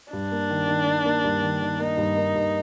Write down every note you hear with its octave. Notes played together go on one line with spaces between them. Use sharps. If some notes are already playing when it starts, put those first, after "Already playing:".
G2 D4
A#3
D#3
D#3
D#3
A#3
G2
D#3
D#3
A#3 D#4
G2
A#3
G2